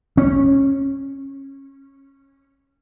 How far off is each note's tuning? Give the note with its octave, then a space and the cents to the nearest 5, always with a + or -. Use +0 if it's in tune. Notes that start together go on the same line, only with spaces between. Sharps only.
C#4 -20